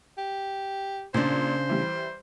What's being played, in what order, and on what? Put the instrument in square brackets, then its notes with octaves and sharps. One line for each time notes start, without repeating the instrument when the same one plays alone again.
[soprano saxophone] G4
[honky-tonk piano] A#2 [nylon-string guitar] C#3 D4 [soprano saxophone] C5
[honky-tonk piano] E3 G3